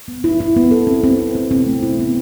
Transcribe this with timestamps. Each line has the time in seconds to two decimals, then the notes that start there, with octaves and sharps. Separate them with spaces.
0.08 B3
0.24 E4
0.40 E4
0.56 B3
0.71 A4
0.87 C4
1.04 C4
1.19 C4
1.35 C4
1.51 C4
1.66 A3
1.82 E4
1.99 B3